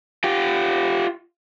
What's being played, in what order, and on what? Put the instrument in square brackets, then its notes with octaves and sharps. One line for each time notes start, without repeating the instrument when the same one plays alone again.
[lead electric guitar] F4 G4